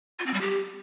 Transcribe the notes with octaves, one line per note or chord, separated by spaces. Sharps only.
F4
C4
G3
G4